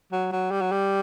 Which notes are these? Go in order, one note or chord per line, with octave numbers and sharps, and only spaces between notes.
F#3
F#3
G3
F#3
G3